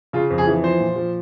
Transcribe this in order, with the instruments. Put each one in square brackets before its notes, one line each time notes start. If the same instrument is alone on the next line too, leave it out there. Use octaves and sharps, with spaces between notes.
[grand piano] C#3 F4
F2
G#4
E3
F3 C5
A#2
F3